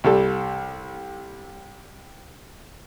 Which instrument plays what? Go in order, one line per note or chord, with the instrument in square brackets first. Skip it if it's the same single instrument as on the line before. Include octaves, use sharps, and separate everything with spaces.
[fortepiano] C2 G3 A4